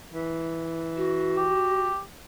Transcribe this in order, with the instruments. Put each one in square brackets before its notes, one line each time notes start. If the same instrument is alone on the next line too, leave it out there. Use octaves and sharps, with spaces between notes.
[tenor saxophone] E3
[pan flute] F#4
[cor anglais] G4